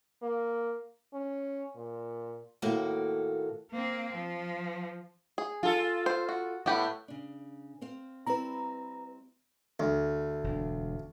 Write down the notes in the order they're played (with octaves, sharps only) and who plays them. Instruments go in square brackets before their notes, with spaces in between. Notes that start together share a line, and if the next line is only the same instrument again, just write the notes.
[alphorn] A#3
C#4
A#2
[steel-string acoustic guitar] D#2 A2 A#3 F#4 A4
[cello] A#3 C4
F3
[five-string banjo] G#4
[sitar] F4 A4
[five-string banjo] C5
F#4
[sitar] A2 [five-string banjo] B3 G4 B4
[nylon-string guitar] C#3 D4
C4 C5 F5
[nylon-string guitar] G3 C4 E4 [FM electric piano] B4 A#5
[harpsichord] D2
[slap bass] E1 D4